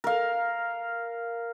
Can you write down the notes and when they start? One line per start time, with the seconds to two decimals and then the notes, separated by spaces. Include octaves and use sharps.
0.04 A#4 F5